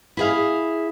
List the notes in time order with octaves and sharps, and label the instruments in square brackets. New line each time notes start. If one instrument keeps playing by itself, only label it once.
[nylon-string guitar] E4 G#4 F5